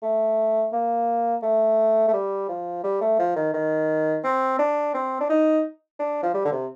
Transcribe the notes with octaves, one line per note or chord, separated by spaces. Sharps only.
A3
A#3
A3
A3
G3
F3
G3
A3
F3
D#3
D#3
C4
D4
C4
D4
D#4
D4
F3
G3
D3
C3